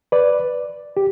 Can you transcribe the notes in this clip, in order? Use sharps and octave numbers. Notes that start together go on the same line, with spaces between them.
B4 D5
G4